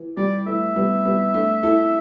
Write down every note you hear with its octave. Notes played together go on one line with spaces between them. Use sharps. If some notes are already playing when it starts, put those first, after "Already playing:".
Already playing: E3
G3 D5
E3 A3 E5
G3 B3
G3 B3
A3 D4
E4 A4